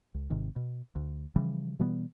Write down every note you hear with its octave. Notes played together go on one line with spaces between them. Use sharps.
C#2
G#1 G#2 C3 D#3
B2
D2
C#3 E3 F3 G3
B2 E3 G3 B3